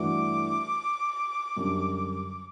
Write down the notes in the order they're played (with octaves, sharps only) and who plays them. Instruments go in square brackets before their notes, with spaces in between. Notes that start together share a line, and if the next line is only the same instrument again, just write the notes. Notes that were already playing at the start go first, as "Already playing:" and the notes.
Already playing: [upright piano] G2 E3 A3 D4 F#4 [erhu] D6
[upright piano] F#2 D3 G3